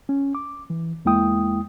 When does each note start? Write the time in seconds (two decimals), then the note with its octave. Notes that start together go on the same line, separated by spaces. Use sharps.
0.09 C#4
0.35 D6
0.70 E3
1.05 E2 G#3 A#3 E4 G5 D#6